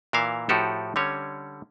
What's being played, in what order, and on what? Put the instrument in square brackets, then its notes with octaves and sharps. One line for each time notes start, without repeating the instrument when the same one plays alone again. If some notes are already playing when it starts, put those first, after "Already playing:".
[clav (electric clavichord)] A#2 E3 A#4 E5 F5
A2 F3 F#4 G4 A4
D3 G3 C#4 C#5